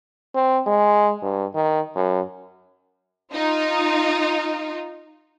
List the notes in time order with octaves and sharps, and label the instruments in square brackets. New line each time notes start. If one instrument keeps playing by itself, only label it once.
[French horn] C4
G#3
G2
D#3
F#2
[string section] D#4 F4